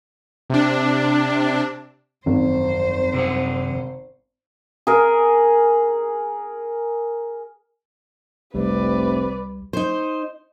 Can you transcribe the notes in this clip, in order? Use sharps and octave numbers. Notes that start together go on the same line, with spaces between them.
C3 D4
G#1 F#2 F3 C#4 C5
C3 G#4 F#5
G#4 A#4
F1 C2 C3 G3 B4 D5
D#4 C5